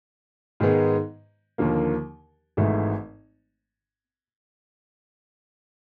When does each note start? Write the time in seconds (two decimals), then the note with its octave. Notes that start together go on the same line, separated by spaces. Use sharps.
0.60 G#2 D#3 G#3 B3
1.58 D#2 D3 F3 A#3
2.57 G#1 G#2 E3 A3